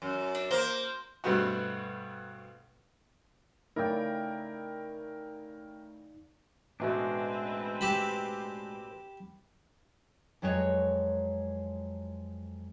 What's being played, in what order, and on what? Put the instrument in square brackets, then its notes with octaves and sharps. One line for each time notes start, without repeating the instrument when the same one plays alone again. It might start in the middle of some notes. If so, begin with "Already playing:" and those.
[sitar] F#2
[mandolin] D4
[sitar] A#3 [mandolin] C5
[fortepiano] G2 B2 A3 B3 C4 F#4
[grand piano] C#3 A3 E4 [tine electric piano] D#4 D5 [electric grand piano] A#4 G5
[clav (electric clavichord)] A1 B2 A3 [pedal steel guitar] G#3 D4 [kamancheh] C4 B4
[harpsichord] G4 A5 B5
[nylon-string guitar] F2 F#3 G#3 B4 C#5